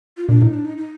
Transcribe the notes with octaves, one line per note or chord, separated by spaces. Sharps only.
F4
A#2 D4
A2 D#4
D4
D#4
D#4